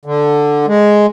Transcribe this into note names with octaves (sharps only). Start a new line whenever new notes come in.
D3
G#3